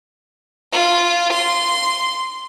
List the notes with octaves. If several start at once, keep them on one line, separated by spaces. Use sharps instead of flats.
F4
C6